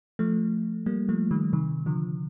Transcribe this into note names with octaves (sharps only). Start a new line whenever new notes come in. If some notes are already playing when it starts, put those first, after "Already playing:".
F3 A3
G3 A#3
F3 A3
D#3 G3
C3 D#3
D3 F3